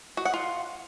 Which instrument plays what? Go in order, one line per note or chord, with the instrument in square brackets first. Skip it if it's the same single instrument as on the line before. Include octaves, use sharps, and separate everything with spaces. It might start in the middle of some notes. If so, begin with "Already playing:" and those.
[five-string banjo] F#4
F#5
F4